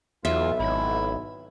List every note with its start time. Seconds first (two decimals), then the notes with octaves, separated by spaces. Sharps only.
0.25 B1 E2 F4 E5
0.59 G#1 E4